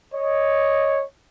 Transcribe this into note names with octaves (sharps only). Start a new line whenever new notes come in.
C#5 D#5